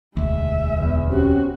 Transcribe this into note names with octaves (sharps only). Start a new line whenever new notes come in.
E1 D2 G#3 E5
E2
C4 C#4 F#4 G4